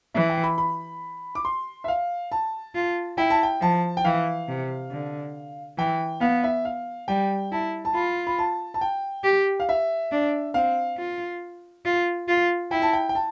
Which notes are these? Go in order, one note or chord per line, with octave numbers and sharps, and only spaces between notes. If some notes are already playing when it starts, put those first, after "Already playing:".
E3 E5
G5
B5
B5
D6
C6
E5
F5
A5
F4
E4 G5
A5
G5
F3 A5
G5
E3 F5
C3
D3
E3 G5
B3 F5
E5
F5
G3 G5
E4 A5
A5
F4 B5
B5
A5
A5
G5
G4
F5
E5
D4
C4 F5
F4
F4
F4
E4 G5
A5
G5
G5
A5